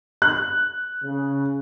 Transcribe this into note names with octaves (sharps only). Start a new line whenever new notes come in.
F#6
C#3